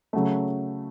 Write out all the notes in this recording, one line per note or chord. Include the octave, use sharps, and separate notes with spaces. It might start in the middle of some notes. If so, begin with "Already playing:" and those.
C#3 F#3 A3